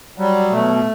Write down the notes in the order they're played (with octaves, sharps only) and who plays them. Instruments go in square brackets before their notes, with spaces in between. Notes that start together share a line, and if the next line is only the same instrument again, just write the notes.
[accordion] F#3 G3
B2 A3